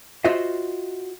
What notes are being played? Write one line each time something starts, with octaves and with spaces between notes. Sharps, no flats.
F4 F#4 C5 D#5 E5